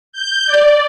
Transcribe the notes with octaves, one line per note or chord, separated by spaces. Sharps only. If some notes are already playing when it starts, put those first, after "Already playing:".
G6
D5